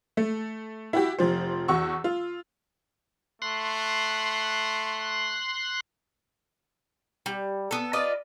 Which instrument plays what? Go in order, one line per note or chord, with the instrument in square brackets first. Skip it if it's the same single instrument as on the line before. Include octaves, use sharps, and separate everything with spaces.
[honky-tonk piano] A3
E4 F#4 G4
F1 F3 C5
E2 F#4 C#6 E6
F4
[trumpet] A3 [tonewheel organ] C6 F#6
[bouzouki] G3
B3 A4
F4 B4 D5 D#5